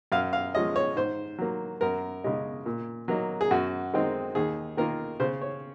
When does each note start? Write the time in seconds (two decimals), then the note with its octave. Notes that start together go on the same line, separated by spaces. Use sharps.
0.12 F#2 F5
0.33 F5
0.55 F3 G#3 C#4 D#5
0.76 C#5
0.96 G#2 C5
1.38 F#3 A#3
1.81 F#2 A#4
2.24 C#3 G#3 D#4
2.66 A#2
3.08 F#3 A#3 D#4
3.41 G#4
3.51 F#2 F#4
3.93 D#3 G#3 C4 D#4
4.35 D#2 G#4
4.77 D#3 A#3 F4 A#4
5.20 C#3 C5
5.42 C#5